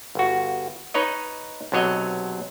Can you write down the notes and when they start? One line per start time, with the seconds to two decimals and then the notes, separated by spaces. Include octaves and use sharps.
0.15 G1 F#4
0.94 D#4 B4 C#5 D#5
1.72 B1 C3 F#3 C#5 D#5 F#5